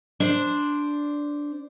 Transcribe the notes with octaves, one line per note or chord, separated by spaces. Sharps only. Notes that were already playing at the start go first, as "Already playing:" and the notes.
D4 C5